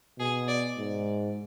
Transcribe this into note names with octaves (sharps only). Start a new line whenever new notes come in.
B2 G#4
D5
G#2